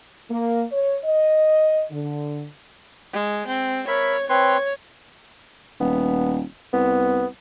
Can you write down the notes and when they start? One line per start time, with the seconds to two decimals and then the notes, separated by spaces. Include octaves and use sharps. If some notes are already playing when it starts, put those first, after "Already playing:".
0.31 A#3
0.72 C#5
1.04 D#5
1.91 D3
3.13 G#3
3.48 C4
3.88 A#4 C#5 E5 B5
4.30 C4 B4 C#5 C6
5.80 D#1 B3
6.73 C2 B3